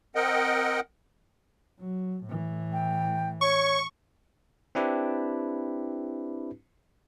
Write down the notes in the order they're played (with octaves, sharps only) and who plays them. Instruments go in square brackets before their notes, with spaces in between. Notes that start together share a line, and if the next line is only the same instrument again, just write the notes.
[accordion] C4 A#4 D#5 F#5 G5
[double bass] F#3
A2 E3
[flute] G5
[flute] C#5 [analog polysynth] C#6
[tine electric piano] C4 D4 E4 G4 B4